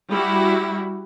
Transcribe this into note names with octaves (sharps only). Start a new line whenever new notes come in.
G3 E4 F#4